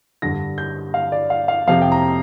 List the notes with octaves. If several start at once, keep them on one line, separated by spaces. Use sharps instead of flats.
G2 D3 A#6
G6
F5
D5
F5
F5
F2 C3 F5
G5
A#5